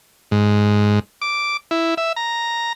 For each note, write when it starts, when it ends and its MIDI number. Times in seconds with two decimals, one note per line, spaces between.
0.31 0.99 44
1.22 1.57 86
1.71 1.94 64
1.97 2.12 76
2.16 2.73 82